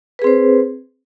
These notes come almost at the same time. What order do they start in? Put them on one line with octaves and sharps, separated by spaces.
B4 G#4 C4 C5